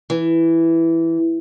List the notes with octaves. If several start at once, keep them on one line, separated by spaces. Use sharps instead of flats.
E3